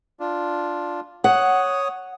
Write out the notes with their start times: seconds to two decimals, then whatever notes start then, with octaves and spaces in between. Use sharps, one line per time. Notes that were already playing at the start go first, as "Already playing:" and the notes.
0.20 D4 F4
1.24 C#5 F#5 D#6